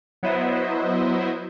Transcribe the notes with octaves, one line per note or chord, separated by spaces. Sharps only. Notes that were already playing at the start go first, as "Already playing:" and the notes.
F#3 B3 E4 C5 D#5 E5